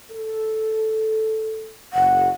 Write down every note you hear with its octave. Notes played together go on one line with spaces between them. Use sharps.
A4
F#1 F#5